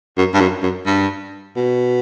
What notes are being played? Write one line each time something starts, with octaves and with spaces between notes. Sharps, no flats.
F#2
G2
F#2
F#2
G2
B2